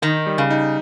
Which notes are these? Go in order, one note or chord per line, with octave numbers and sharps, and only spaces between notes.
D#3 D#4
G3
C#3
D#4